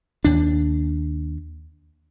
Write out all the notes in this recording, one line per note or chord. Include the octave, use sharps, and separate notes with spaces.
D#2 D4